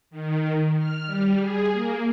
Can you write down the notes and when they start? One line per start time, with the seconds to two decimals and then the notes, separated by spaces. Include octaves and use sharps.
0.11 D#3
0.77 F6
1.06 G3
1.38 G#4
1.73 A#3